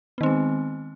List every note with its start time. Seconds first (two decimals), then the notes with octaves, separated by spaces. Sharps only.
0.18 B3
0.21 D#3
0.23 C4
0.26 G#3